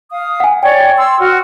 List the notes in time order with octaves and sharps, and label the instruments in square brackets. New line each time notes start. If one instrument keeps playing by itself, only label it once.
[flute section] F5 D#6
[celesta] F#5 G#5
[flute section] C#5 D5 [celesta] G5
[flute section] C6 E6
F#4 F6